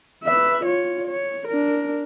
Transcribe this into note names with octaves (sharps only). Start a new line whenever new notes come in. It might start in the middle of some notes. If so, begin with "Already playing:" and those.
B4 E5
F4 C#5
C#5
D4 A#4